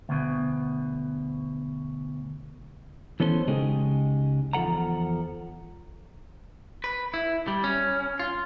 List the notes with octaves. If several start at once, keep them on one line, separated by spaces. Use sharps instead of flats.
D2 B2
E3 B3 C#4 A4 B4 C5
C#2 C#3 G#3 D#4 G4 G#4
E2 F3 A4 F#5 A#5
B4
E4
G3
C#4
F4